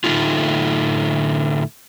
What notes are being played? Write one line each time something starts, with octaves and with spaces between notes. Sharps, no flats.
A2 D3 A3 A#3 D#4 F4